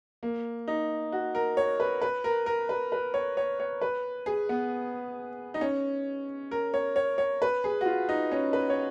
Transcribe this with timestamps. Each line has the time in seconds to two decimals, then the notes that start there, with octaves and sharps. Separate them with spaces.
0.23 A#3
0.68 D#4
1.12 F#4
1.35 A#4
1.57 C#5
1.80 B4
2.02 B4
2.24 A#4
2.46 A#4
2.69 B4
2.92 B4
3.14 C#5
3.37 C#5
3.60 C#5
3.81 B4
4.26 G#4
4.49 B3
5.54 D#4
5.61 C#4
6.51 A#4
6.74 C#5
6.96 C#5
7.18 C#5
7.42 B4
7.64 G#4
7.81 F#4
7.86 F4
8.09 D#4
8.32 C#4
8.53 B4
8.70 C#5